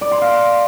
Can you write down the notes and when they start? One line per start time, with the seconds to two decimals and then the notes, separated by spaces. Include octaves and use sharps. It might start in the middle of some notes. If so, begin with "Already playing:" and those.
0.01 D5
0.12 C6
0.22 F5